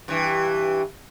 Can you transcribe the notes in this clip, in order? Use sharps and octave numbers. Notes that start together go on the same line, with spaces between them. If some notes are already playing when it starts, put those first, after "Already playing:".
G2 E3